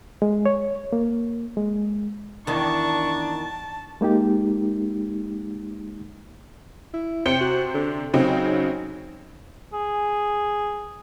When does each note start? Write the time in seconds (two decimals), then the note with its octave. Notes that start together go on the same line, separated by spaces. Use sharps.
0.22 G#3
0.46 C#5
0.93 A#3
1.57 G#3
2.47 E2 D#3 D4 A5 C#6
4.01 G#3 A#3 D#4 G4
6.94 E4
7.26 C3 C5 G5 C#7
7.41 F#4
7.74 D3
8.14 C#3 F#3 C4 D#4
9.73 G#4